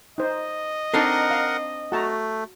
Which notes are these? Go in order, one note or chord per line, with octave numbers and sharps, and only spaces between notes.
D#4 C5 D#5
C4 D4 D#4 A4 A#4 F#5
F5
A3 F#4 A5 A#5